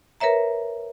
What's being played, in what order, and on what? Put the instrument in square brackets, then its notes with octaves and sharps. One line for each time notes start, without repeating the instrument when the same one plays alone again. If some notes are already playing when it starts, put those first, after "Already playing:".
[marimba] A#4 B4 C#5 E5 A#5